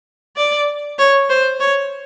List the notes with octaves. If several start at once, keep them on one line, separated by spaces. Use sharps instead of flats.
D5
C#5
C5
C#5